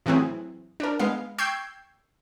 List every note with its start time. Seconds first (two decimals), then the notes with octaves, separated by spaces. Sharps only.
0.06 A2 E3 F#3 C4 E4 G#4
0.80 D4 A#4
0.99 G#3 B3 F5
1.38 G5 C#6 E6 G6 G#6 C7